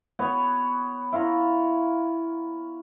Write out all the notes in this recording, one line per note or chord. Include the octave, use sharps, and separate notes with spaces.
B3 F#4 C#5
E4 F4 C#5 A#5